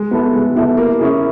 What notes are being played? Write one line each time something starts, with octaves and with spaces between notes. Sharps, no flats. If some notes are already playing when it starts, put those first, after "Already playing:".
Already playing: G#3
B3 E4 A4
G#3
B3 E4 A4
A#3
C#4 E4 G#4